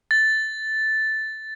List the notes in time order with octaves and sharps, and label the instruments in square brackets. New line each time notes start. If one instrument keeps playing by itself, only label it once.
[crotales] A6